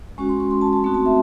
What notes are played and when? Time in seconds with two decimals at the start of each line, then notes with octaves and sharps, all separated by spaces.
0.18 G#3 C#4 F#4 C#6
0.29 C6
0.40 C#6
0.51 C6
0.61 A5
0.73 A5
0.84 A3 C4 D#4 F#4 C6
0.94 A5
1.06 E5